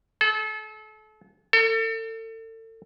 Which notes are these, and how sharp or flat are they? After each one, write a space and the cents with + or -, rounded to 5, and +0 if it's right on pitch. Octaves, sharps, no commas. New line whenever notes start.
A4 -35
A4 +35